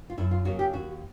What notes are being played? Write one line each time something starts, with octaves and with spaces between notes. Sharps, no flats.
F4
F#2 E4
F4
C#3 F#3 A#3 C#4 F#4
G4
D#2 F#4